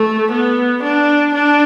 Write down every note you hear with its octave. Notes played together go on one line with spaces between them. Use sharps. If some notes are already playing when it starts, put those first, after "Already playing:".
Already playing: A3
B3
D4
D4